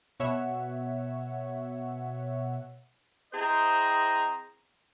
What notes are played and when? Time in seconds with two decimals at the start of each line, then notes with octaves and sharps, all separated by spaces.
0.20 B2 C#5 E5 F#5
3.33 C4 E4 G#4 C5 D#5 A#5